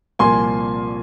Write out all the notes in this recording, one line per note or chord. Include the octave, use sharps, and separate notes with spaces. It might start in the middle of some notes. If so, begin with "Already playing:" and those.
C2 A#2 F3 A#3 G#5 C6